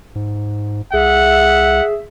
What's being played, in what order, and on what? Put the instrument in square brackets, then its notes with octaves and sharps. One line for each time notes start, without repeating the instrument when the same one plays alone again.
[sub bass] G#2
[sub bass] C2 [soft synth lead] G#4 [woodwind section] E5 [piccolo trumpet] F#5